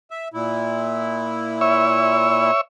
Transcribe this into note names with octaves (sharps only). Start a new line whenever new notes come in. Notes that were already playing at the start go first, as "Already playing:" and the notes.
E5
A#2 E4
C#5 E5